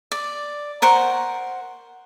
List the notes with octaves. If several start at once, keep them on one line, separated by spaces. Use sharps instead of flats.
D5
A#4 C5 F#5 C#6